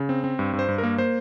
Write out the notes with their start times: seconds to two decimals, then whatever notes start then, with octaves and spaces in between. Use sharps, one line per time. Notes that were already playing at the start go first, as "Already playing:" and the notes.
Already playing: C#3
0.09 C4
0.24 C4
0.39 G2
0.53 G2
0.59 C5
0.68 G2
0.78 A#4
0.83 A#3
0.98 A#3 C5